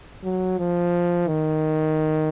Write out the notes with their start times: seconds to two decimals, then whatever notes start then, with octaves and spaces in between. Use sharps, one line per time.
0.24 F#3
0.58 F3
1.28 D#3